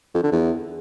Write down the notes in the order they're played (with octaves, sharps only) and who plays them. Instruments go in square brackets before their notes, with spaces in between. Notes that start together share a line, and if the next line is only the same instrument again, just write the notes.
[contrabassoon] F2
D3
E2